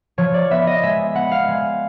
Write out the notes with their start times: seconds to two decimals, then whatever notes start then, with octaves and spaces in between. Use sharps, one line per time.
0.18 F3 C#5
0.34 D5
0.50 B3 E5
0.67 D#5
0.83 G#3 E5
1.15 B3 F#5
1.31 F5
1.48 G#3